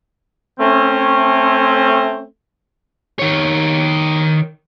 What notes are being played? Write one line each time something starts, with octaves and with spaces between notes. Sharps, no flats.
A3 C4 C#4
D#3 C#5